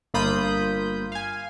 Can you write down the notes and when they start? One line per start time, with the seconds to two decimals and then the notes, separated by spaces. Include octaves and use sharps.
0.14 G1 A#3 F4 B5 D#6 G6
1.12 F5 G#5